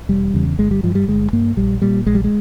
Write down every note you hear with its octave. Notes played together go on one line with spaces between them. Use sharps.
E1 G3
E2 C#3
G1 G#3
G3
G2 F3
G3
G1 G#3
G2 A#3
A#1 G3
A#2 G3
A#1 G#3
G3
G#3